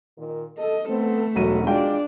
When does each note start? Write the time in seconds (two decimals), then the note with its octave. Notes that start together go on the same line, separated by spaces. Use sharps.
0.18 A#2 D#3
0.58 A4 D#5
0.88 A3 B3 C4 A4
1.36 E1 F2 D#3 F#3 F#4 D#7
1.67 G#3 D4 F4 D5 G5